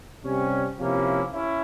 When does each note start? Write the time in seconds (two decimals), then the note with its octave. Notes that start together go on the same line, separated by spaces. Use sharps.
0.23 C3 G3 C#4
0.78 C3 F3 A#3 C#4 E4
1.32 C#4 E4